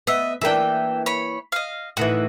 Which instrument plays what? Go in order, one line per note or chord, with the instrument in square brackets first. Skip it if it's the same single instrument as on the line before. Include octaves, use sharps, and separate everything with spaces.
[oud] B3 [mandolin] D#5 E5
[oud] E3 A#3 D4 [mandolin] E5 G5
[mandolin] C#5 B5
D#5 F5
[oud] A2 D#3 E3 [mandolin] F#4